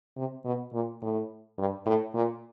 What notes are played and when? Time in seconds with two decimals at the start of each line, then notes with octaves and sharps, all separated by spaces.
0.17 C3
0.45 B2
0.73 A#2
1.02 A2
1.58 G2
1.86 A2
2.14 A#2